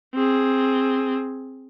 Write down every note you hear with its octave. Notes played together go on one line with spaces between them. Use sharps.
C4 G#4